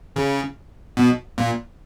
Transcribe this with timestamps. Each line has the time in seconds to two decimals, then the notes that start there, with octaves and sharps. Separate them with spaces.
0.16 C#3
0.97 B2
1.38 A#2